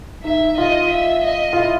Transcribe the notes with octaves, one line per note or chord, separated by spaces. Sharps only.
D#4 E5
F4 D#5
E5
D#5
F4
E4